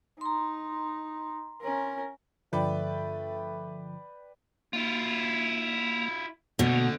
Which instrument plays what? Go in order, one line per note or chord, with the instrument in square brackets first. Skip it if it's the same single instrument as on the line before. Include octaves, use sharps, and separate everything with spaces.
[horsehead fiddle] D#4 [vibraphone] A#5 C6
[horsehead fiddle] C#4 A#4
[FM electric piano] G2 D3 F3 [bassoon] A3 [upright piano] B4 D5 G5
[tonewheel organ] A#3 [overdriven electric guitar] E4 F4
[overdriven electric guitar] D2 D3 [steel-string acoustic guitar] B2 [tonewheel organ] A#3